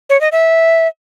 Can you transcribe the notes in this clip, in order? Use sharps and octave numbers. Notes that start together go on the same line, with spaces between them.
C#5
D#5
E5